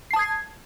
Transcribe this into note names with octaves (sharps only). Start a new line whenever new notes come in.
A5 D#6 G#6 C7